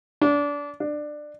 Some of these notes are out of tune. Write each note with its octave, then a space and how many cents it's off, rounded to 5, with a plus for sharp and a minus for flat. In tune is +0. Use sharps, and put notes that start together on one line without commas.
D4 -25
D4 +20